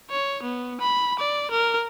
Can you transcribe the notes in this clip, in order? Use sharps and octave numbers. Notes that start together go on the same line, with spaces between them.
C#5
B3
B5
D5
A#4